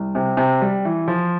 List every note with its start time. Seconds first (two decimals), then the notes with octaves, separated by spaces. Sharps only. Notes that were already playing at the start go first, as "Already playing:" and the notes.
Already playing: C2
0.15 C3
0.37 C3
0.62 G3
0.85 E3
1.08 F3